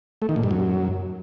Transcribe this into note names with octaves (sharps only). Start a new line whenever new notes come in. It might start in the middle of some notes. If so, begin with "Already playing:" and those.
A3
D#3
A#2
G2
F#2